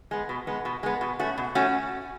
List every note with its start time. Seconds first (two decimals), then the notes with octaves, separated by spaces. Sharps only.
0.11 G#3 B3
0.29 B2
0.47 G#3 B3
0.65 B2
0.83 G#3 B3
1.01 B2
1.19 A3 C#4 F#4
1.38 B2
1.55 A3 C#4 F#4